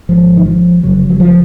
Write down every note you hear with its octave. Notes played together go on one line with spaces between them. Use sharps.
G#1 G#2 F3
D#3
F3
F1 F2 C#3 F#3
F#3
F3